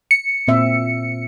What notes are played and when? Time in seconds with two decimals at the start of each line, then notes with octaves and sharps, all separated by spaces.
0.11 C#7
0.48 A#2 C4 E5